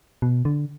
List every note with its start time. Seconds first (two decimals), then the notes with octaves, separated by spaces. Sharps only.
0.22 B2
0.45 D3